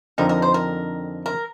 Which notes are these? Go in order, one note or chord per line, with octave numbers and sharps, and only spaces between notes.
F2 D3 F3 C4 D#4 A#4
A#4
C5
A#4
A#4